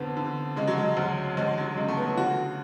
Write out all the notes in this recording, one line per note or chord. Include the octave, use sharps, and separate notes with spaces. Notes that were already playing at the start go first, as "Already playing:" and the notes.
Already playing: F2 D3 B3
D3
C#3 G#3
F#3
G#3
D2
D2 G#3
F#3
C#3 G#3
A3
B3
D3 F#4